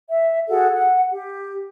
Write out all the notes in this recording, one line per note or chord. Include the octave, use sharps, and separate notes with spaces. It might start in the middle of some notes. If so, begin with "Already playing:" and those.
E5
F#4 G#4 A4 F#5
F#5
G4